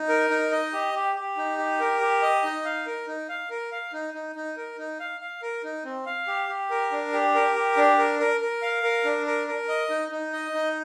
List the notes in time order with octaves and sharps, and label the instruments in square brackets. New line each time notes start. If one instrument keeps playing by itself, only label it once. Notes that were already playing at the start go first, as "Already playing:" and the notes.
Already playing: [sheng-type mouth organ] D#4
A#4
D#4
D#5
G4
G4
G4
D#4
G4
A#4
G4
D#5
D#4
F5
A#4
D#4
F5
A#4
F5
D#4
D#4
D#4
A#4
D#4
F5
F5
A#4
D#4
C4
F5
G4
G4
A#4
D4
G4
A#4
G4
D4
A#4
A#4
A#4
F5
A#4
D4
A#4
A#4
D#5
D#4
D#4
D#5
D#4